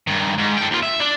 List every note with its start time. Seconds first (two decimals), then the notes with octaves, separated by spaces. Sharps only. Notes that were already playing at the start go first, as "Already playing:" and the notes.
0.07 G2 D#3
0.38 G#2
0.57 A4 G5
0.71 D#2 F4
0.83 E5
1.00 D4